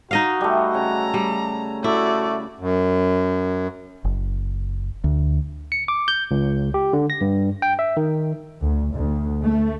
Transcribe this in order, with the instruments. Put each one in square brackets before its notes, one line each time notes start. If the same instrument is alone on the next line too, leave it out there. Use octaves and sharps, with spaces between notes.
[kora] D#4 D#5 F5 [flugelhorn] F#4
[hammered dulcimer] G3 A3
[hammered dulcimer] C#3 [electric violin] A#5
[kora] G3
[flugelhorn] A3 [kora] E4 [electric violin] F#4 D5
[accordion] F#2
[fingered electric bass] F#1
D2
[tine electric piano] C#7
D6
G6
C#2
G4
D3
A#6
G2
G5
E5
D#3
[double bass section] D2
D2
A3